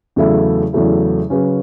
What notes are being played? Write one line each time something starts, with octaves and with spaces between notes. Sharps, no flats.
E2 C#3 F#3 A3 E4
E2 C#3 F#3 A3 E4
C#3 F#3 C#4 G#4 B4